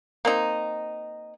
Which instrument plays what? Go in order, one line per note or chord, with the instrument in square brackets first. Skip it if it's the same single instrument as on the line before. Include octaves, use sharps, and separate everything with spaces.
[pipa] A#3 C4 D#4